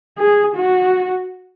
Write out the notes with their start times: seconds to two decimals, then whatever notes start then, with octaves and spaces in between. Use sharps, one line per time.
0.18 G#4
0.55 F#4